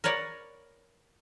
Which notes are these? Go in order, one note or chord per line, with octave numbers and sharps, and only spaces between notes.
A#4 B4 C#5 D5 F#5